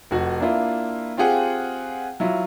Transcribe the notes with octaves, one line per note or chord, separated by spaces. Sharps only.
F1 F#4 F#5
A#3 D4 E4 F4
C4 F4 G4 G#4 F#5
F#3 E4 F4